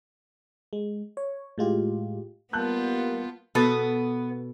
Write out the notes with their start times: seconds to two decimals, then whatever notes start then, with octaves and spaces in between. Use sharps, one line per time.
0.73 G#3
1.17 C#5
1.58 A2 G#3 F4 G4
2.53 G3 A#3 B3 F4 A5 F#6 G6
3.55 B2 B3 A4